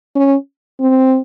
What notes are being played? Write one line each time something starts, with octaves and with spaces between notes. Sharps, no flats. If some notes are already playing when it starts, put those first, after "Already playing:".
C#4
C4